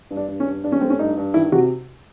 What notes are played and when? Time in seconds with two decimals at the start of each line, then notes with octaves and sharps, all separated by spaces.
0.11 G2
0.17 D4
0.28 G2
0.40 C#4
0.46 G2
0.64 G2 D4
0.72 C#4
0.81 A3 C4
0.90 C#4
0.99 G2 D#4
1.17 G2
1.34 D#3 E4
1.52 C3 F#4